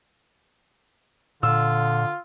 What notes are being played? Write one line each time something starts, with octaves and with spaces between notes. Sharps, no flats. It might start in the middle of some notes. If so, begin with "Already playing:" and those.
A#2 D3 F4 E6